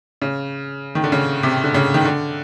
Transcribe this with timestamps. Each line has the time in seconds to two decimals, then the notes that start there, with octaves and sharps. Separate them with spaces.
0.22 C#3
0.95 D#3
1.04 D3
1.12 C#3
1.43 C3
1.64 D3
1.74 C#3
1.94 D#3
2.05 D3